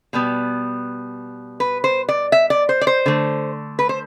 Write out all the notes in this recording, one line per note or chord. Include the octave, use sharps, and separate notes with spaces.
B2 G3 B3
B4
C5
D5
E5
D5
C5
D5
C5
D3 A3
B4
C5